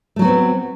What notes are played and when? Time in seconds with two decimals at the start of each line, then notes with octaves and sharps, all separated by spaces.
0.16 A3
0.19 F#3
0.22 F#4
0.25 B3
0.28 C4